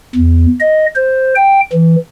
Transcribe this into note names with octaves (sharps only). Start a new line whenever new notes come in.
E2
D#5
C5
G5
E3